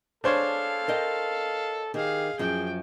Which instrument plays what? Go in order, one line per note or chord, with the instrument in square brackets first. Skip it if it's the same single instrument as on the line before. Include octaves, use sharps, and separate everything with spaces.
[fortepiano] D4 C5 C#5 [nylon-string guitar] G#4 [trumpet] A4 [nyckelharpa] F5
[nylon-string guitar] A#4 D#5 G5
[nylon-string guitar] D#3 [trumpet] G4 [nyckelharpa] G#4 F5
[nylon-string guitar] F#2 F3 [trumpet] G#4 [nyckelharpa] G5